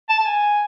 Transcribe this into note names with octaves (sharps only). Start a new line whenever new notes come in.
A5
A5
G#5